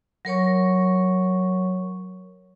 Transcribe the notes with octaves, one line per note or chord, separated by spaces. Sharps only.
F#3 A#4 C#5 C#6